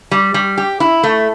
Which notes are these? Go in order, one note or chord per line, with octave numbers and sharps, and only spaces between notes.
G3
G3
G4
E4
A3